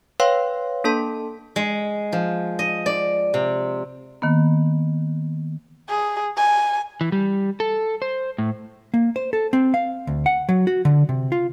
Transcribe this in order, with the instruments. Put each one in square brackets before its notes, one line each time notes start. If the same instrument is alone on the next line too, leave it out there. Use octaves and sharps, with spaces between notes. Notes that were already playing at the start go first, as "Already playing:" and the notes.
[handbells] B4 C#5 F5 G5 C6
A#3 D4 A4 A5 C6
[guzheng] G#3
F3
D#5
D5
C3
[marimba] D#3 A#3 B3
[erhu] G#4
G#5
[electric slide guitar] E3
G3
A4
C5
A2
[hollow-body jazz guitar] A#3
C5
A4
C4
F5
D2
F#5
F#3
F#4
D3
C3
F4